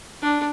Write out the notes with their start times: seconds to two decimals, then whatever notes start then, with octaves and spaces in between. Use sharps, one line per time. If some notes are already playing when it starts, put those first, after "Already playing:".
0.22 D4